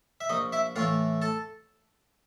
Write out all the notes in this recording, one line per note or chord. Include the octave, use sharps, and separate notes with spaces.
E5
A#1 D#4 D#5
E4 E5
A2 E3 A3 F4 F5
A4 A5